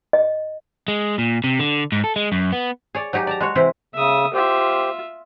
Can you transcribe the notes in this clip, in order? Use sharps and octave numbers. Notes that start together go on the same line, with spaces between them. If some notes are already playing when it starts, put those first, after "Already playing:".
D#5
G#3
A#2
C3
D3
G#2
A4
G#3
F#2
B3
G#4 C#5 D5
F#3 D#4 G4 G#4
D5 A5 A#5
G#3 F#4 C#5
C3 E3 E4 C5
C#3 E5 D#6
F4 G4 C5 E5